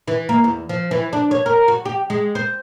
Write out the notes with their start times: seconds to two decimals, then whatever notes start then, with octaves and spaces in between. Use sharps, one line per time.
0.08 E3
0.29 A#3
0.44 E2
0.69 F3
0.91 E3
1.13 D4
1.31 C#5
1.46 A#4
1.68 F#4
1.85 G4
2.10 G#3
2.35 C5